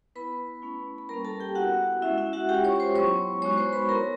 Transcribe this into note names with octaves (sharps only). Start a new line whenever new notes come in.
B3 E4 B4 B5
A3 C#4 E4
B5
G3 A#3 C#4 A#4 A#5
A4 A5
G4 G5
B3 E4 F#4 F#5
G#3 C#4 E4 F#4 E5
E4 E5
F#4 F#5
G#3 C#4 F4 G4 G5
C#5 C#6
C5 C6
F#3 B3 E4 C#5 C#6
G#3 B3 D#4 F#4 C#5 C#6
C5 C6
B4 B5
B3 E4 A#4 A#5